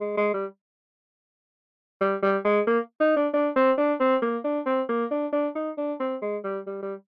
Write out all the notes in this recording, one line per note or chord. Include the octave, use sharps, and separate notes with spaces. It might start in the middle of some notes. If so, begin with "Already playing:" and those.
G#3
G#3
G3
G3
G3
G#3
A#3
D#4
D4
D4
C4
D4
C4
A#3
D4
C4
A#3
D4
D4
D#4
D4
C4
G#3
G3
G3
G3